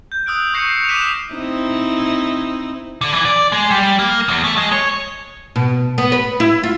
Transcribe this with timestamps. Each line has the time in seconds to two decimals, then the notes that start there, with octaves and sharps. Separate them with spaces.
0.12 G6
0.26 D#6 E6 F#6 D7
0.54 C#6 G6 A#6 C7 C#7 E7
0.76 C#7 F7
0.89 D6 F6 F#6 B6 D#7 E7
1.33 C4 D#4 E4
3.01 D3
3.13 E3
3.25 D5
3.52 G#3
3.71 G3
3.99 A#3
4.29 E2
4.44 A3
4.57 G#3
4.72 C#5
5.56 B2
5.98 B3
6.12 B4
6.40 E4
6.64 F4